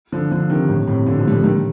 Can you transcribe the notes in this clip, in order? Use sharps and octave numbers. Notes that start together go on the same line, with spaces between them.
D3 F3
D3 F3
C3 D#3
A2 C3
A2 C3
A#2 D3
D3 F3
G3
D3 F3
D#3 G3